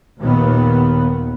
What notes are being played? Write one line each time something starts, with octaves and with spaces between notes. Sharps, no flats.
D#2 A#2 D#3 B3